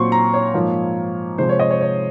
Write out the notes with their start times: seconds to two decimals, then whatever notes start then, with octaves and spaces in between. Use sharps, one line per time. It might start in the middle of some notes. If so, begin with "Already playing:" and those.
Already playing: A#2 F#3 C4 C6 C#6
0.12 A#5
0.34 C#5
0.54 G#2 F3 A#3
1.38 C3 F3 G#3 C5
1.49 C#5
1.60 D#5
1.71 C#5
1.81 C#5